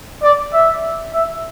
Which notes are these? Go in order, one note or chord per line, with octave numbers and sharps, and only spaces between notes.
D5
E5
E5